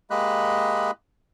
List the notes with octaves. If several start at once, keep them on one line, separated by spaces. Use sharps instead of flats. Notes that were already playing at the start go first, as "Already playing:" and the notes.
G#3 A#3 G4 D#5 B5 F#6